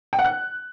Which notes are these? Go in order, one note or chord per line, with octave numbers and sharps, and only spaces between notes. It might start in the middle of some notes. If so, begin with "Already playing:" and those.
G5
F#5
F#6